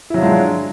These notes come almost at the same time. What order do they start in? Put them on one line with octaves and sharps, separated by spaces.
E4 F#3 F3 G#3 D4